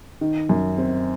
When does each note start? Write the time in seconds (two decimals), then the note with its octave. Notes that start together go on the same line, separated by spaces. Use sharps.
0.21 D#3
0.49 F#2
0.78 C4